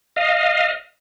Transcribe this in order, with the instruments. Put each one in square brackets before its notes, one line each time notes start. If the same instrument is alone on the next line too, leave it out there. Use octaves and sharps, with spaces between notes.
[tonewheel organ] D#5 F5